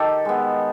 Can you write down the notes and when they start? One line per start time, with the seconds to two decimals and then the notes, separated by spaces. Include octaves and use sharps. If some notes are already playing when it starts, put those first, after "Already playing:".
Already playing: D#3 G4 A4
0.25 G#3 B3